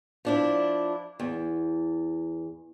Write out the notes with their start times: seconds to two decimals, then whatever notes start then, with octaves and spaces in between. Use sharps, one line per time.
0.25 F3 D4 E4
1.20 E2